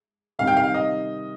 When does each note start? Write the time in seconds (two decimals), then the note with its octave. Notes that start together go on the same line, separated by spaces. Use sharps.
0.39 C3 D#3 G3 C4 D#4 F5
0.47 G5
0.57 F5
0.74 D#5